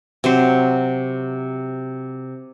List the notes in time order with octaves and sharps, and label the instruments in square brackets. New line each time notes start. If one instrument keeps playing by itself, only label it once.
[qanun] C3 F#3 C5